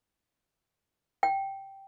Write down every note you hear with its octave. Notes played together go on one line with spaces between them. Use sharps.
G5